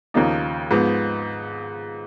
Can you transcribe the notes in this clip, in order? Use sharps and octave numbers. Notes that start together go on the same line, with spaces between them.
D#2 C#3 F3 A#3 D#4
G#2 F3 B3